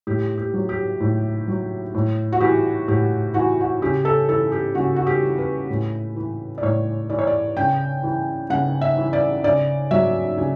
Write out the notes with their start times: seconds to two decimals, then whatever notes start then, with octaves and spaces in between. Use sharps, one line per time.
0.07 A2 G4
0.38 G4
0.54 F#3
0.69 G4
1.00 A2
1.48 F#3
1.94 A2
2.32 F#4
2.41 E3 G4
2.88 A2 G4
3.34 E3 F#4
3.61 F#4
3.82 C#3 G4
4.05 A4
4.29 E3 A4
4.52 G4
4.75 C#3 F#4
4.96 F#4
5.07 G4
5.22 E3
5.38 B4
5.70 A2
6.16 E3
6.58 D5
6.62 A2 C#5
7.10 E3 D5
7.19 C#5
7.27 D5
7.57 C#3 G5
8.03 E3
8.50 C#3 F#5
8.81 E5
8.97 E3
9.13 D5
9.44 C#3 D5
9.91 F#3 E5
10.38 C#3